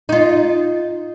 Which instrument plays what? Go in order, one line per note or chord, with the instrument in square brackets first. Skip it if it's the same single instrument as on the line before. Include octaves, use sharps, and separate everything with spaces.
[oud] D#4 F4